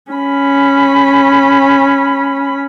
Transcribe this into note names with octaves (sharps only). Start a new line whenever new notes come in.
C#4 B5